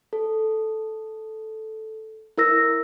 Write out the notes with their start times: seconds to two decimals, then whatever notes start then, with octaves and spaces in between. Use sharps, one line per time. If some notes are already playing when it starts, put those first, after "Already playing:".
0.13 A4
2.38 E4 A#4 E6 A#6